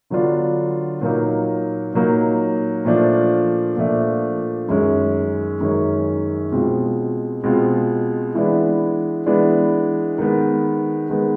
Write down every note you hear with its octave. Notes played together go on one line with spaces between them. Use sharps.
D3 F#3 B3 D4 F4
A#2 F#3 A#3 D#4
A#2 F#3 A#3 D#4
A#2 F3 A3 D4
A#2 F3 A3 D4
F#2 D#3 G#3 C#4
F#2 D#3 G#3 C#4
B2 G#3 C4 F4
B2 G#3 C4 F4
E3 G#3 B3 D4
E3 G#3 B3 D4
D#3 G#3 B3
D#3 G#3 B3